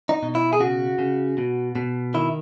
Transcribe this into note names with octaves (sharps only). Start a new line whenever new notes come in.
D#4
B2
E4
G#4
C#3 F#4
C#3
B2
B2
D#3 E4